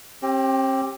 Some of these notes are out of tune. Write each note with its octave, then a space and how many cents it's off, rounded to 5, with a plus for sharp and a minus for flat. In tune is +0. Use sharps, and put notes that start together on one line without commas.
C4 +45 G4 +0